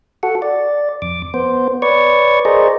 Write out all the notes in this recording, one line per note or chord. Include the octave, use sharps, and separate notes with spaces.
F#4 A4 F#5
D5
F2 D6
B3 C5
B4 C#5 D5 C#6
G#4 A#4 C5 D5 D#5